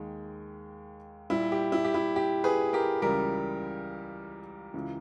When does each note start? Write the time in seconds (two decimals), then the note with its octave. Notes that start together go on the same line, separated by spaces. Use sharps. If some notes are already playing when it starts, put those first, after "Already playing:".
Already playing: D#2 D#3 G#3
1.30 A#2 G3 E4
1.52 G4
1.72 E4
1.85 G4
1.94 E4
2.16 G4
2.44 G#4 B4
2.73 G4 A#4
3.02 C#2 C#3 E3 G3 G4 A#4
4.74 C#2 C#3 E3